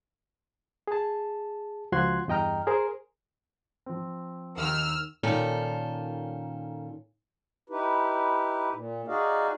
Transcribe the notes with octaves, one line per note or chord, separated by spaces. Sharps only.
G#4 A5
C#2 F3 F#4 C6 F#6 G#6
E2 G2 D#5 G5 A#5 F6
G#4 A#4 C5
F3 C4
D#2 D#3 E6 F6
A#2 D#3 C#4 F4 A4
D#4 E4 G4 B4
A#2
D#4 F#4 G#4 D5 D#5 F5